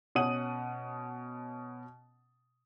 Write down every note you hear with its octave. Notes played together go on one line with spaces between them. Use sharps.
B2 C#4 F#5 D#6 D#7 F#7